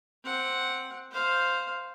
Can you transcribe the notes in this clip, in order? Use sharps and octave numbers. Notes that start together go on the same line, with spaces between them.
C4 F#5
C5 F5